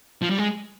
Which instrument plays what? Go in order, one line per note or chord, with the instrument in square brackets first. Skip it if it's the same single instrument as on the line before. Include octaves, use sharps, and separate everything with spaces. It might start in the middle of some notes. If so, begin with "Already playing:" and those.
[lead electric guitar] F3
G3
G#3